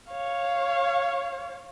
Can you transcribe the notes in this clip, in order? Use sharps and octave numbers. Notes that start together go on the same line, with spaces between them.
C#5 F5